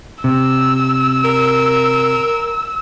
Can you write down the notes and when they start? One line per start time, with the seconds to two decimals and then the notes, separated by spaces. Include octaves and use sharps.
0.24 C3 E6
1.25 A#4